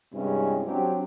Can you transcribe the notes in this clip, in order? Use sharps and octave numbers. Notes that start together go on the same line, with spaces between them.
G2 C3 G#3 C#4 E4
F#3 C4 D4 G4